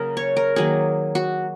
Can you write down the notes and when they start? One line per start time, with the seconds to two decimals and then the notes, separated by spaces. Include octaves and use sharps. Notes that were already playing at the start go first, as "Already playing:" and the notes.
Already playing: C#3 F#3 A#3 G#4 A#4
0.17 C#5
0.36 A#4
0.56 D#3 F#3 A#3 G#4
1.15 F#4